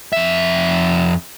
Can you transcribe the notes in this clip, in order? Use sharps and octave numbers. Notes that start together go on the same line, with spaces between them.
F2 E5